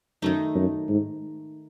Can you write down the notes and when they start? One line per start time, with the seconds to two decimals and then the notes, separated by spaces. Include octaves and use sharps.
0.22 F#2 D#3 A3 D#4
0.55 F#2
0.88 G#2